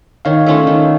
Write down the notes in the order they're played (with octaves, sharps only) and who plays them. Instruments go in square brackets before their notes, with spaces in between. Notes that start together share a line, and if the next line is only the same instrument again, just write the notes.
[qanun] D#3 [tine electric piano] C#5 F5
[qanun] A3 C#4 F4
D#3